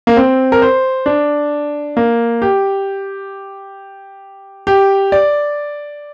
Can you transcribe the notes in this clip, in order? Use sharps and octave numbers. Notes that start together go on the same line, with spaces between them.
A#3
C4
A#4
C5
D4
A#3
G4
G4
D5